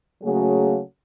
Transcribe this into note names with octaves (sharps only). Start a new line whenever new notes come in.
C#3 F#3 A3 A#3 F#4 G#4